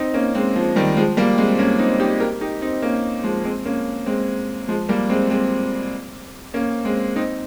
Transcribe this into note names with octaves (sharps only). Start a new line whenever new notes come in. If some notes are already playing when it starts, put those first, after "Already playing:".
Already playing: C4 D#4
A#3 C#4
G#3 C4
F3
D#3 G3
F3 G#3
G3 A#3
G#3 C4
A#3 C#4
C4 D#4
D#4 G4
G4 A#4
D#4 G4
C4 D#4
A#3 C#4
F3 G#3
G#3 C4
A#3 C#4
G#3 C4
F3 G#3
G3 A#3
G#3 C4
G#3 C4
A#3 C#4
G#3 C4
C4 D#4